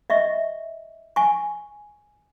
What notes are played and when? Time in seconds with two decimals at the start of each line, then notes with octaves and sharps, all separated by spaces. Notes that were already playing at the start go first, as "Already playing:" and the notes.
0.10 D#5 E5 C#6
1.16 G#5 C#6